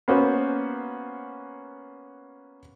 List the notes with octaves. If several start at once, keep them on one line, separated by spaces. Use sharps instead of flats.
A#3 B3 C#4 F#4 C5